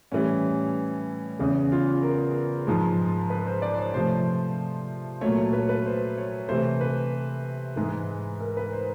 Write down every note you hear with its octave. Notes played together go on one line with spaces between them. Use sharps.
A2 E3 G3 C#4
E2 C#3 E3 C#4
F4
A#4
G#2 F3 G#3
B4
C5
D5
C5
C#5
C3 F3 A3 C5
A#2 F#3 A3 C#5
C#5
B4
B4
C5
C#5
C3 E3 A3 C5
B4
G#2 E3 G#3
A#4
B4
C5